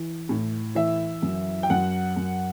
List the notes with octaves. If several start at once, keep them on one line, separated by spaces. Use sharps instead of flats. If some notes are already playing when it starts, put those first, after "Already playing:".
Already playing: E3
A2
E3 E5
F#2
G5
F#2 F#5
F#2